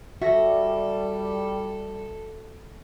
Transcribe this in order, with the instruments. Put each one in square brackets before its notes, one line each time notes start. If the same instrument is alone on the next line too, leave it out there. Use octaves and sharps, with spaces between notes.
[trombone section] G3 [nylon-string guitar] F#4 [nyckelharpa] A4 [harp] E5 A#6